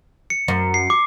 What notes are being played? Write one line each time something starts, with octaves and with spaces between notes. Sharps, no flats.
C#7
F#2
C7
D6